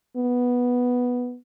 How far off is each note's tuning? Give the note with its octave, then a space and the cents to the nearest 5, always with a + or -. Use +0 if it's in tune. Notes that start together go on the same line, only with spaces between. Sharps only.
B3 -5